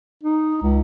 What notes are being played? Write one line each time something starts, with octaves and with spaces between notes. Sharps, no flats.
D#4
C#2